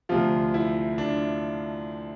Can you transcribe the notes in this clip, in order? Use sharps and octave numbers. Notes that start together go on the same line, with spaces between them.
D2 C3 F3 F4
E4
D4